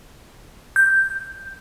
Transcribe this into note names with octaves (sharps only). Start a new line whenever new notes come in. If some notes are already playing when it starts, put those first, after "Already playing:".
G6